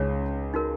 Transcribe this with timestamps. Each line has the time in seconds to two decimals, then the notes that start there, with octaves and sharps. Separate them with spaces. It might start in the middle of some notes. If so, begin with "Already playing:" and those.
Already playing: C#2 C#3 D#4 G#4 C#5
0.54 D#4 F#4 A#4